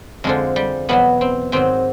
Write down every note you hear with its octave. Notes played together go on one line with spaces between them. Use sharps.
F2 D3 F3 G#3
G3
E2 B2 F#3 B3
C4
G#2 D#3 F#3 C4